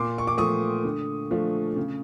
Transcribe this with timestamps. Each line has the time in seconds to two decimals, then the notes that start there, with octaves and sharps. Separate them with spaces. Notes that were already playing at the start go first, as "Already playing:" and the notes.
Already playing: A#2 C6 D6
0.18 C#6
0.27 D6
0.37 F3 A3 C#6 D#6
0.84 D3
1.31 F3 A3 D4
1.76 C#3